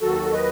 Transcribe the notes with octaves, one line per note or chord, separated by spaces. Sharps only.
D#2 D#3 F#3 F#4 A4
B4 D#5